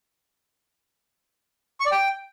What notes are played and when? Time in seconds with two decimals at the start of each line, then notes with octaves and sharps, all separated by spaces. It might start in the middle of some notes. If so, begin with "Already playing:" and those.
1.80 C#6
1.86 D5
1.92 G5